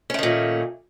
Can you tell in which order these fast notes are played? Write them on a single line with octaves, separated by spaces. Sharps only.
C#4 A3 D#3 A#2